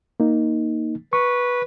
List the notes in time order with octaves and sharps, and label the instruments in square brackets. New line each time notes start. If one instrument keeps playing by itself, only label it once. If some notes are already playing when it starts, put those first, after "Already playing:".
[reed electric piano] A#3 D#4
[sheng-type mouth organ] B4 [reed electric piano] C#6